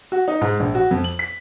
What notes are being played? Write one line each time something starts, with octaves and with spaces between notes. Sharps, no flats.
F#4
D#4
G#2
A#1
F#4
F2
F#7
B6